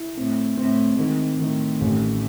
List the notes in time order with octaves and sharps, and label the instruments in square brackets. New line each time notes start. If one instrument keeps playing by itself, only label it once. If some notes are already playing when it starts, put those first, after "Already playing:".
Already playing: [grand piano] E4
[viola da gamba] A2 [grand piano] C4
[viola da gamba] A2 [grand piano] C4
[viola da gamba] G#2 [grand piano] D#3
[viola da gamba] A2 [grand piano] D#3
[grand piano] A1